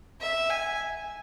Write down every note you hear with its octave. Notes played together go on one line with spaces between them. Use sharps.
E5
G#5